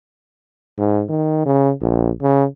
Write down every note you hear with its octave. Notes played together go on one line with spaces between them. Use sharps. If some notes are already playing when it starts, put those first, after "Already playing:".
G#2
D#3
C#3
A#1
C#3